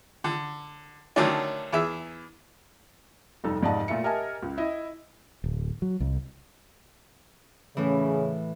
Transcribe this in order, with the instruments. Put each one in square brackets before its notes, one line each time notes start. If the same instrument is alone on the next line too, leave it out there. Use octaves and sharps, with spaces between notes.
[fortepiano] D3
D3 D#3 F#3 A3 C#4 D4
E2 G#4 E5
[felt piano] F1 G2 D#4 A4
F1 G#2 D5 D#5 F5 A5
A#2 A3 F4 E5 C#7
G4 A#4 D#5 E5 G#5 A5
C#2
E4 D#5
[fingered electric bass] D1
F#3
C2
[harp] A2 E3 [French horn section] C#3